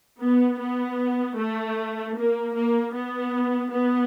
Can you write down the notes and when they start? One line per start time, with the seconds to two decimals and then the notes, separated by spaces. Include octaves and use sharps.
0.22 B3
0.60 B3
1.38 A3
2.16 A#3
2.55 A#3
2.94 B3
3.72 B3